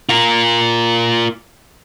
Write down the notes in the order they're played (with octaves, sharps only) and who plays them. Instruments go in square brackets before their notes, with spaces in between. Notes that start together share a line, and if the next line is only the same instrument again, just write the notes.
[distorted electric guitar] F4 A#4